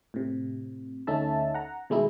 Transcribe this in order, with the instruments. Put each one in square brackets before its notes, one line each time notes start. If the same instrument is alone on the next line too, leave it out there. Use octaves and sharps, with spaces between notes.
[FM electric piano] A2 C3
D2 A3 C#4 D#4 E5 A5
F#5 A#5
B2 D#3 G#3 A3 D#4 E4